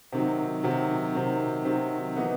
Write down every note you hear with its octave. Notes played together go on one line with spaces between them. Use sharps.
C3 D#3 F#3
C3 D#3 F#3
C3 D#3 F#3
C3 D#3 F#3
E3 B3 D#4